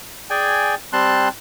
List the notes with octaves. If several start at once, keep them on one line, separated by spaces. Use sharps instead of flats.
G#4 D5 G5 G#5
G3 C4 A5 C6 F#6